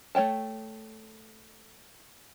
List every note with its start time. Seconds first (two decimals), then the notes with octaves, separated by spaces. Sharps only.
0.15 A3 C#5 G5 A5